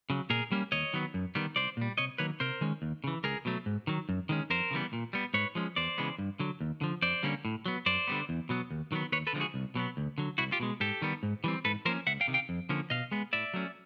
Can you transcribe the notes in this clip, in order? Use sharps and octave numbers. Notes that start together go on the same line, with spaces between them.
C#3 F#3
A#2 G#4 A#4
G3 A#3 C#4
D#2 C#5 D#5
D#3 F#3 B3
F#2
D#3 G3 B3
C2 C5 D5
A#2 G3
C3 C#5 D#5
D#3 F#3 A#3 B4 C#5
C3 A#4 C5
D#3 G#3 C#4
D#2
C#3 E3
C#2 G#4 A#4
B2 F#3 A3
G#2
D#3 F#3
F#2
D#3 G#3 C#4
F2 A#4 C5
C#3 E3 G3 B3
A#2
G3 B3
G#2 B4 C#5
F3 G#3 C#4
E2 C5 D5
C#3 E3 G#3 B3
G2
D3 F#3
D#2
D3 F3
F2 C5 D5
D3 G3 A#3 C#4
A2
F#3 B3
F#2 C5 D5
D3 G3 B3
E2
B2 F#3 B3
D#2
D#3 F#3 B3
D#2 B4 C#5
A4 B4
D3 F3 G#3 C4
F#4 G#4
C2
B2 F#3 B3
D2
D3 F#3
C2 E4 F#4
F4 G4
B2 G#3
G#2 G4 A4
D#3 G3 B3
G#2
E3 G3 C4
G#2 A4 B4
F3 A#3 C#4 A#4 C5
C#2 E5 F#5
F5 G5
C3 D#3
F5 G5
F2
D3 F3 A#3 C#4
B2 D#5 F5
G#3 B3
A2 D5 E5
F#3 A3 C#4